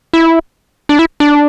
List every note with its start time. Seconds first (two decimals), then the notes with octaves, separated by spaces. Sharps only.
0.13 E4
0.89 D4
0.99 E4
1.20 D4